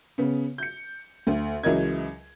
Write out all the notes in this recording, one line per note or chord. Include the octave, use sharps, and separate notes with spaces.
C#3 B3
G6 C#7
D2
C#2 E3 F#3 A#4 D#5 G#6